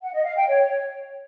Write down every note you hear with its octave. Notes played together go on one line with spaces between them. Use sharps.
F#5
D#5
F5
G5
C#5